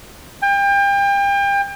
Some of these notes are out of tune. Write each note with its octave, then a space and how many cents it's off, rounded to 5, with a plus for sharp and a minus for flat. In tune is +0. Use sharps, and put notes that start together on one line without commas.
G5 +35